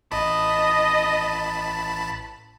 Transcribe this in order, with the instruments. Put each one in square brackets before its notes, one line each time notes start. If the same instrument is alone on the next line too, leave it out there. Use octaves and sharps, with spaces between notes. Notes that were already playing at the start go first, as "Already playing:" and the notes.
[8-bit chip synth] A1 A5 B5 [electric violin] D#5